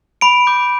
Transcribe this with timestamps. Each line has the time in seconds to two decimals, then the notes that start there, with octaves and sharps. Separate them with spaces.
0.21 B5 D7
0.47 D6 G6